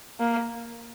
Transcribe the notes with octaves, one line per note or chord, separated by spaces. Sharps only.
A#3